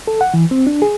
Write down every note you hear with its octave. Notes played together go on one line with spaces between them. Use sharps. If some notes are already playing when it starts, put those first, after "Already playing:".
A4
F#5
E3
C4
D4
G#4